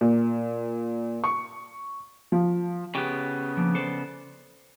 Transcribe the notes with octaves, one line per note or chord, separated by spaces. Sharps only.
A#2
C#6
F3
C#3 B3 G4
F3 A#3 D4
A4 C5 D5